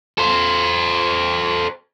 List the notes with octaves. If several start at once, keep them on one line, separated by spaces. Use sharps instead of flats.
A4 C5